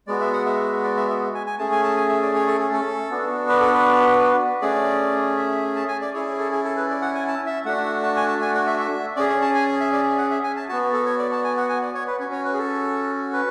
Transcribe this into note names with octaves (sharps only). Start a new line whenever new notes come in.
G#3 B3 F#4 D5
E5
F#5
E5
D5
E5
E5
G#5
G#5
A3 C#4 G#4 A5
G#5
A5
G#5
E5
D5
C#5
A4
G#4
A4
B3 D4 F#4
B4
A4
B4
A3 C#4 G#4 D5
E5
A5
G#5
D5
C#4 E4 G#4 C#5
A4
G#4
A4
B4
D5
F#5
G#5
A5
E5
A3 D4 F#4 F#5
A5
G#5
A5
G#5
F#5
E5
E5
C#4 G#4 D5
C#5
A5
G#5
E5
D5
F#5
E5
G#5
A5
B3 F#4 A5
A4
C#5
D5
A5
G#5
F#5
G#5
D5
C#5
B4
C#4 F#4 C#5
C#5
B4
G#4
A4
B4